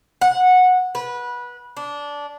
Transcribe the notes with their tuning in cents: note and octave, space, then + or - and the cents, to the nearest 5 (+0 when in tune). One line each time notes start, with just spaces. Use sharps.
F#5 -15
B4 -20
D4 -15